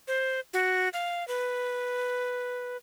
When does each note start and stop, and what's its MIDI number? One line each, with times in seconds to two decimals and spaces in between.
0.08 0.40 72
0.53 0.89 66
0.93 1.26 77
1.28 2.77 71